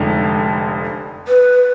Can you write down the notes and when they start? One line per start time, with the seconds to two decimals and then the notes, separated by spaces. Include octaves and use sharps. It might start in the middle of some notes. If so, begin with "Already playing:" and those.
Already playing: F1 F2 D3 G#3 D#4
1.28 B4